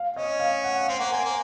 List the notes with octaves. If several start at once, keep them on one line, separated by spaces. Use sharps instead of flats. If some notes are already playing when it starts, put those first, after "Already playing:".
Already playing: F5
C#4 D#5
F5
F#5
F5
C4 F#5
A#3
C4 G#5
A#3